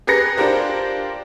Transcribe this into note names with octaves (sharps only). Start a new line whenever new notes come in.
G4 G#4 B4 A#5 A#6 C#7
D4 F4 G4 A#4 C5